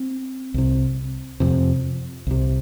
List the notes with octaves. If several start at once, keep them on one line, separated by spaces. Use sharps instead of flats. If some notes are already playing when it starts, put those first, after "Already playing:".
Already playing: C4
C2 C3
F2 C3
C2 C3